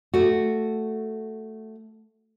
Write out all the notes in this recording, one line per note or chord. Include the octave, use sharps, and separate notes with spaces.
A3 F#4